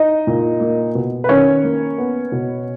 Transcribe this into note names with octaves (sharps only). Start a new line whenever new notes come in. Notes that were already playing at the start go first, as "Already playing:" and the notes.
Already playing: D#4 D#5
A#2
A#3
B2
B4
D#3 C#4 C#5
A#3
B3
B2